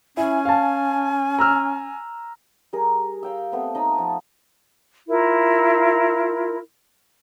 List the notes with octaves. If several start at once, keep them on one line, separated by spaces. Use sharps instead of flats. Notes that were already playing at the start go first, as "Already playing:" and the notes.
C#4 E4 G#5
F5 A5
A#5 E6 F6
G3 G#4 A#4
F5 G5 E6
A3 B3 C4
D#4 A5 B5 D#6
F3 F4
E4 F4 A#4